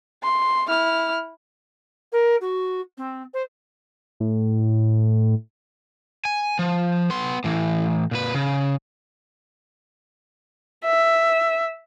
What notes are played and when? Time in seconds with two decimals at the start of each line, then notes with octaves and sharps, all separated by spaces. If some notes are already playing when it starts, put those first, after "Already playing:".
0.23 C6
0.68 E4 F6
2.12 A#4
2.41 F#4
2.98 C4
3.34 C5
4.20 A2
6.25 G#5
6.59 F3
7.10 B3 C6
7.44 A2 E3
8.11 A#2 B4
8.34 C#3
10.85 E5